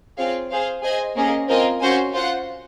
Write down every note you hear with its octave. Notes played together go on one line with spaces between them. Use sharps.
C4 F4 G#4 C#5 F5
G#4 C5 F5
G#4 C5 D#5 G#5
A#3 C#4 G#4 D#5
C4 F4 A#4 D#5 G#5
C#4 F#4 C5 F5 G#5
F4 C5 F#5